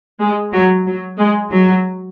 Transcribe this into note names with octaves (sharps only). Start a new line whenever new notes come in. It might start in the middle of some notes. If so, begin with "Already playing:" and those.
G#3
F#3
F#3
G#3
F#3